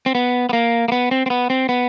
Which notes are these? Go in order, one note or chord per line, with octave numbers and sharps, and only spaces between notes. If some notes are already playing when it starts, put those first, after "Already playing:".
C4
B3
B3
A#3
A#3
B3
C4
C4
B3
C4
B3